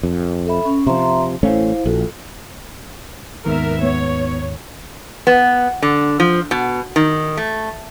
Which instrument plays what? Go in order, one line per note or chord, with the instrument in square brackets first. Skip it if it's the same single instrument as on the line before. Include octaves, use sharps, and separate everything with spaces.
[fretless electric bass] F2
[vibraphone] A4 E5 B5
C#4
[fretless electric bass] C3 F3 [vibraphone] E5 A#5 C6
[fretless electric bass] A1 A3 C#4 [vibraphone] E4 C5 F5
[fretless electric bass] A#1 [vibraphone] F4 F#4 A4
[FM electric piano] D#2 G#2 D#3 [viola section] B3 A#4 E5
[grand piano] B3 [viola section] C#5
[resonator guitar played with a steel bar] B3
D3
F3
B2
D#3
A3